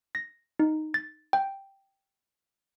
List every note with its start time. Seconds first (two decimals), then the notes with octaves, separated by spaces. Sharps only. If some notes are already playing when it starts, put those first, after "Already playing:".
0.15 A#6
0.59 D#4
0.94 A6
1.33 G5